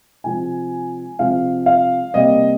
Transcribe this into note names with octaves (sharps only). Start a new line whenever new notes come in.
C3 F3 G#3 G#5
C3 F3 G#3 F5
F5
C3 G3 A#3 D#5